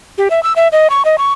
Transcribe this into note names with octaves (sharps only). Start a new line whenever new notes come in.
G4
E5
E6
E5
D#5
C#6
D#5
C#6